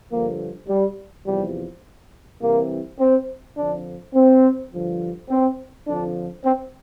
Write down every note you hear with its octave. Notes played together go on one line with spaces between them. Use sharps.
G2 D3 F3 A#3
G3
E2 C3 F3 G3
C2 C3 E3 A#3
C4
F2 D3 F3 D4
C4
G2 D3 F3
C4
F2 D3 F3 D4
C4